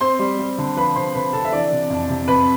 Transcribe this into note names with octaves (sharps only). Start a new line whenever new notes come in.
C4 C5 C6
G3
G3
D3
F3 B4 B5
C3 C5 C6
C3 B4 B5
C3 A4 A5
E5
E3 D4 D5
C3
F2
C3
F2 B4